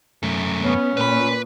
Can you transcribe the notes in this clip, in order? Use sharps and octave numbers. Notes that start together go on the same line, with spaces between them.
F#2 A3
B3 C#4
A#2 B4 B5